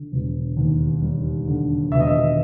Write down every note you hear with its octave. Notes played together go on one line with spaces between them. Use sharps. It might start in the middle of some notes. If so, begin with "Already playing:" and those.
Already playing: D3
E1
D#2
G3
D3
E1 E5
D#5
E5